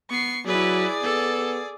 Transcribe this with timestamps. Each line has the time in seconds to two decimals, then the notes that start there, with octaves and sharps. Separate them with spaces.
0.10 B3 C#6 C7
0.46 F#3 E4 G#4 B4 D5
1.03 B3 A4